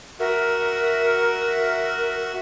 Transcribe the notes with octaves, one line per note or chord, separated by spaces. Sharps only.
F#4 A#4 E5